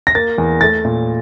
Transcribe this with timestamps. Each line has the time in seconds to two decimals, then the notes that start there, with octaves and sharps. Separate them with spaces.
0.07 A#6
0.15 A#3 A6
0.38 E2
0.61 A3 A6
0.85 A#2